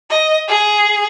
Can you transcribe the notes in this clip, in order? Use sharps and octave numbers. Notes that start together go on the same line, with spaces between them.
D#5
G#4